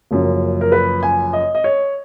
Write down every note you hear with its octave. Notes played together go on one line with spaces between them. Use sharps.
F#1 F#2 F3
A#4
B4
G#5
D#5
D#5
C#5